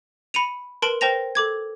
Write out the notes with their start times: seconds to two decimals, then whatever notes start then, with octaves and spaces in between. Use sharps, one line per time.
0.34 B5 C#7 D#7 F7
0.82 A#4 B4 A5 C6 D7 F#7
1.01 A#4 C5 G5 A5 A#6 F7
1.35 A4 D6 G#6